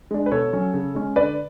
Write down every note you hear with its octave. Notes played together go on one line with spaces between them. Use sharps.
G#3 D4
B4
B2 A4 C#5
F#3 C#4
C#3
G#3 C#4
D3 B4 D5